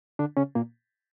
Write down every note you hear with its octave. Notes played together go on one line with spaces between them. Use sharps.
D3 D4
C#3 C#4
A#2 A#3